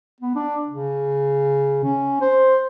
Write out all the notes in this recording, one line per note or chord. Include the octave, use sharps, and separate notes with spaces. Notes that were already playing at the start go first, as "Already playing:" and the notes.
B3
D4
C#3
C#4
C5